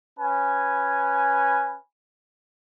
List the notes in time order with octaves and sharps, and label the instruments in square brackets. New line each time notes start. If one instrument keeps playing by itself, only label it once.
[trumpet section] C#4 B4 G#5